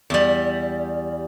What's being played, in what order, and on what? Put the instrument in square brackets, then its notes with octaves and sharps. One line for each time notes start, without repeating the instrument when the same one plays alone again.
[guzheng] E2 G3